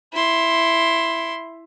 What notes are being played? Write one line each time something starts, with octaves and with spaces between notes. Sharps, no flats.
E4 C6